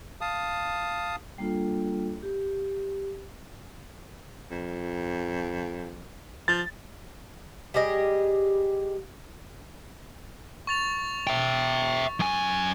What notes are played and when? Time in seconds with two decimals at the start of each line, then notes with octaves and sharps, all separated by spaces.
0.21 F5 A5 D#6
1.38 G3 A#3 D4 F4 A4
2.23 G4
4.51 F2
6.48 F3 A6
7.74 G3 G4 G#4 D#5
10.67 C#6 A6 F7
11.27 E5 G5
12.20 F#2 G#5